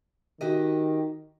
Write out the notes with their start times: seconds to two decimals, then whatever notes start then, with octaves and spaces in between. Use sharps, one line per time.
0.41 D#3 F#4 G4 D#5